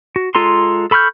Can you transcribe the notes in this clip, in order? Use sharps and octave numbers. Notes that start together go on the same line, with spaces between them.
F#4
G#3 F4 A4 A#5 C6
A4 B5 C#6 F6 G6